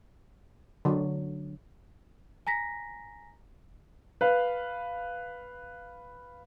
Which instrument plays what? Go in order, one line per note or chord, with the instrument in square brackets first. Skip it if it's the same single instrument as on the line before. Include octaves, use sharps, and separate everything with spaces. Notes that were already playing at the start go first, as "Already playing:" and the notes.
[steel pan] D3 F#3
[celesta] G#5 A#5 A#6 B6
[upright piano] B4 F5